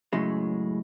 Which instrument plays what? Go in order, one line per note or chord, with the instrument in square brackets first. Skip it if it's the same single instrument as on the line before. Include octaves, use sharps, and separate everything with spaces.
[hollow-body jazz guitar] F#2 A2 C#3 G#3